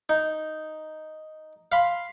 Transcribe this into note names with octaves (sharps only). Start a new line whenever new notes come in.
D#4
F5 B5 C6